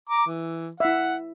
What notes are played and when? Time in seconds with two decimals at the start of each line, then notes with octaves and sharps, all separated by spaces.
0.09 A#5 D6
0.26 E3
0.80 E4 E5 F#5